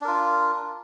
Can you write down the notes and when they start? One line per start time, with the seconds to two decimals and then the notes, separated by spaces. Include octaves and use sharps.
0.01 D4
0.05 A#4
0.08 F4